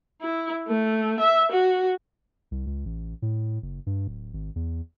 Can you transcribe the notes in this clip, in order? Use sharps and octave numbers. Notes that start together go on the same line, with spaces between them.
E4
A3
E5
F#4
C2
C#2
A1
A2
F#1
G2
D1
G#1
E2